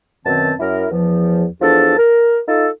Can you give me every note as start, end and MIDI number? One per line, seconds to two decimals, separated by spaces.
0.24 0.53 42
0.24 0.53 47
0.24 0.53 51
0.24 0.53 60
0.24 0.53 81
0.60 0.85 42
0.60 0.85 64
0.60 0.85 70
0.91 1.45 40
0.91 1.45 53
1.62 1.95 40
1.62 1.95 53
1.62 1.95 62
1.62 1.95 69
1.62 1.95 81
1.98 2.39 70
2.48 2.68 63
2.48 2.68 65
2.48 2.68 69